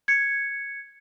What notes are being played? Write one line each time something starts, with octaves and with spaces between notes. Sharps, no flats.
G#6 C#7